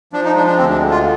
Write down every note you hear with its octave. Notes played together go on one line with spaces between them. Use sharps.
F3 D4
D#4
G#3 D4
D4
D2 C4
D4
D3
F4